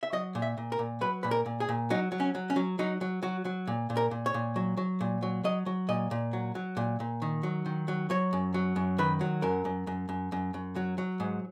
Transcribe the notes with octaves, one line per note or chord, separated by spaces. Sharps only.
E5
F#3 D#5
A#2
E5
A#2
A#4
A#2
F#3 B4
A#2 B4
A#4
A#2
G#4
A#2
F#3 D#4
F#3
C#4
F#3
C#4
F#3
F#3 D#4
F#3
F#3 F#4
F#3
A#2
A#2
A#4
A#2
C#5
A#2
F#3
F#3
A#2
F#3
F#3 D#5
F#3
A#2 D#5
A#2
F#3
F#3
A#2
A#2
D#3
F#3
D#3
F#3
F#3 C#5
F#2
F#3
F#2
D#3 B4
F#3
F#2 A#4
F#2
F#2
F#2
F#2
F#2
F#3
F#3
G#2